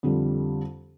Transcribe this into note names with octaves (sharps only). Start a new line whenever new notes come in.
F2 D3 G3